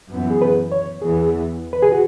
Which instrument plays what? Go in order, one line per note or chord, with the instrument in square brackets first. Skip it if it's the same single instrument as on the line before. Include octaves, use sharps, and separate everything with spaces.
[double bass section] F#2 E3 B3
[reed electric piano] G#4
B4
C#5
[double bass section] E2 E3 B3 [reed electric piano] G#4
[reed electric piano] B4
G#4
F#4